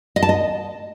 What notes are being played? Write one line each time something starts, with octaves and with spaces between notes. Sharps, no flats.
D#5
A5
D#5